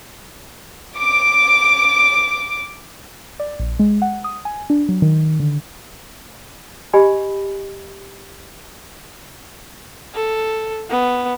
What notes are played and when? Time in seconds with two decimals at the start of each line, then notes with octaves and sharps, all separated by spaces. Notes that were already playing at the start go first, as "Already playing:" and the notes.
0.98 D6 D7
3.40 D5
3.59 A#1
3.79 G#3
4.02 F#5
4.24 D#6
4.45 G#5
4.70 D4
4.89 F#3
5.02 D#3
5.40 D3
6.93 G4 D#5 G#5 B5
10.15 A4
10.90 B3